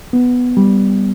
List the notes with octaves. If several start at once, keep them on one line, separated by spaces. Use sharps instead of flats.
B3
G3